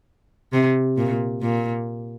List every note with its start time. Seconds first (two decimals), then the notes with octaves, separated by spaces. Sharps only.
0.53 C3
0.97 A#2
1.42 A#2